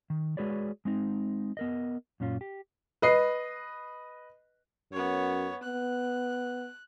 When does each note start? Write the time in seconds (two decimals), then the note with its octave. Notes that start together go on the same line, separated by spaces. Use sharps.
0.10 D#3
0.37 G#3 F#4 G#4 B4 C#5 D5
0.85 G#3 C4 D#4
1.57 B3 A#4 D#5
2.20 F#2 A#2 C#4 F4
2.41 G4
3.02 B4 D#5 C7
4.92 F#2 B3 C#5
5.63 B3 F#6